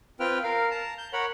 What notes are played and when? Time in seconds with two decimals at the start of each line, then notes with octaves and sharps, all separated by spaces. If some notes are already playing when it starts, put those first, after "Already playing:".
0.20 C4 F4 B4 G5 F6
0.44 A#4 F5
0.71 A5 A#5
0.98 G6
1.13 A#4 C#5 F#5 B5